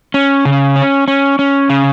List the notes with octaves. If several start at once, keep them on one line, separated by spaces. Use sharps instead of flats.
C#4
C#3
C#4
C#4
C#4
C#3